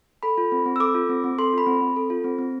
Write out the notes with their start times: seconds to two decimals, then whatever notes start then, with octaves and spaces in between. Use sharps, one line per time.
0.23 A4 B5
0.38 F4
0.52 C4
0.66 C4
0.76 E6
0.80 A4 D6
0.95 F4
1.09 C4
1.24 C4
1.38 A4 C6
1.53 F4 B5
1.66 C4
1.81 C4
1.96 A4
2.10 F4
2.24 C4
2.39 C4